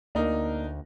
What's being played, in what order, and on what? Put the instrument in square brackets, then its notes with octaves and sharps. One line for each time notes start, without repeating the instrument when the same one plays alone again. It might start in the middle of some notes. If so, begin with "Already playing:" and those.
[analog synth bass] D2 [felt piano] A#3 [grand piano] D4 D#4 A#4